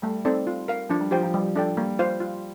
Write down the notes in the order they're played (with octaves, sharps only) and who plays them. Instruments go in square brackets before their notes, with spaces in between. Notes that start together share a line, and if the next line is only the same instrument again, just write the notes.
[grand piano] G3 [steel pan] A3
[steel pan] C4 D#4 A4 D5
F4
A#4 F5
[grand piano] F3 [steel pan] D4
[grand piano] G3
[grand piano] F3 [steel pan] G4 C5 G5
[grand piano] F3
[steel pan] G3
D4 A4 D5 G5
[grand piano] G3 [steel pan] A#3
[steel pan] F4 C5 F5
F4